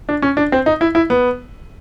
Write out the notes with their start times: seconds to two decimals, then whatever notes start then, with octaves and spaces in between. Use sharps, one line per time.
0.09 D4
0.22 C#4
0.37 D4
0.52 C4
0.66 D#4
0.81 E4
0.95 E4
1.10 B3